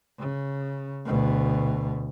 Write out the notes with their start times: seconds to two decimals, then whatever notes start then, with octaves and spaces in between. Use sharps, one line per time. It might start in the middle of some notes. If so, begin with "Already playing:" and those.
0.19 C#3
1.05 D2 B2